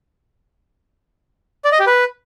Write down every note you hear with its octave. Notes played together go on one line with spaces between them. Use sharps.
D5
D#5
G4
B4